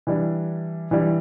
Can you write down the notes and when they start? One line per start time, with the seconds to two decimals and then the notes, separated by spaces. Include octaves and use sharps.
0.07 E3 G3 D4
0.91 E3 G3 D4